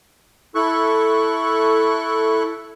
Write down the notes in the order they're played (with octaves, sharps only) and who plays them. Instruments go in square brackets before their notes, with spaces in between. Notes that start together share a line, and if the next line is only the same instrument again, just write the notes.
[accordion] E4 A4 C#6 F#6